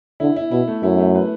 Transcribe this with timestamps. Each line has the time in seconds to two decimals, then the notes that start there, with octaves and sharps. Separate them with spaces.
0.20 D3 E4
0.36 E4
0.51 B2 E4
0.68 A3
0.83 F#2 E4
0.98 A3
1.15 B4